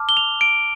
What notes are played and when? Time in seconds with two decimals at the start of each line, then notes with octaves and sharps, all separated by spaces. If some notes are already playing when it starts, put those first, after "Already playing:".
Already playing: A5 D6 F6
0.09 G7
0.17 F7
0.41 D7